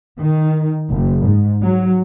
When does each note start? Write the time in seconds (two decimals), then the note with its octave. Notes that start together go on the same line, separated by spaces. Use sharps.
0.19 D#3
0.90 F#1
1.26 G#2
1.62 F#3